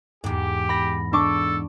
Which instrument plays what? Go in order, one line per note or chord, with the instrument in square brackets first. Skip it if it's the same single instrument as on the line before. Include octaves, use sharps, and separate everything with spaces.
[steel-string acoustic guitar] E2 G#2 [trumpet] G4
[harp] B5 A#6
[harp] D4 C#6 D6 [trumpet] A4